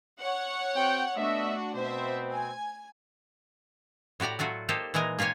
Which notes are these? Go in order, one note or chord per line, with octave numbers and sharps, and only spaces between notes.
C#5 F#5
C4 F#4 G5
A3 B3 D4 F#4 D#5 E5
B2 B3 C4 C5 E5
G#5
A2 F#4 G4 D5 A#5
F#3 A3 F4 F#4
A#3 D#4 G4 A4 C5
A#2 E3 G#3 D#4 A#4
A#3 F4 G4 C#5 G#5